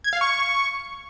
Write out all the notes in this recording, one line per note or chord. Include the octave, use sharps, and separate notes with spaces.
G#6
F5
C#6